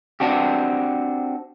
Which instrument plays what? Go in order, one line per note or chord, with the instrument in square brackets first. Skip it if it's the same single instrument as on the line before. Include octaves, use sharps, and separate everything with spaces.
[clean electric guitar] C4 D4 F#4 G4